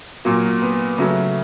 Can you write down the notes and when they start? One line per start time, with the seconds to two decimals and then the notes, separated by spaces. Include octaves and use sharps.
0.25 A#2 F#3 A#3
0.62 B3
0.98 C#3 F#3 A3